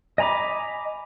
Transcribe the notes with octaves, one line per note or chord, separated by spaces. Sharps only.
D#5 G#5 A#5 B5 D6